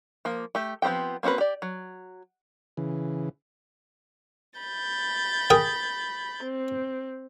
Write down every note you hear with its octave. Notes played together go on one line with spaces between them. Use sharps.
F3 A#3
A3 G4
F3 B3 C4 G4 G5
A#3 C4 C#4 F#4 B4
G4 D5
F#3
C#3 E3
B5 G6 A6
G#4 A#4 G5
C4